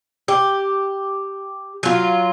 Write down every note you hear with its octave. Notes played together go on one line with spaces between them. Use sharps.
G4
F#3 F4